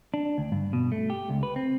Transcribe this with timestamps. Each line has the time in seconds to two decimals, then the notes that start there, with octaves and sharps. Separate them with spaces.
0.14 D4
0.38 D2
0.52 G2
0.73 B2
0.92 A3
1.10 G4
1.30 C#2
1.43 B4
1.56 C4